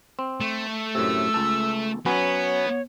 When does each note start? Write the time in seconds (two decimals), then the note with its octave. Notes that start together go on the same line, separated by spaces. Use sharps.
0.19 C4
0.41 A3
0.95 F#2 A2 C3 E6
1.34 C#2 A4
2.06 F#3 B3 C#4 B4 C#5